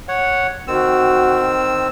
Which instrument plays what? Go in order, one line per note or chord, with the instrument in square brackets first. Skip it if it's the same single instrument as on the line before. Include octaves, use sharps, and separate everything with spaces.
[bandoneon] C#5 F#5
[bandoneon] D#3 C4 E6 [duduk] F#4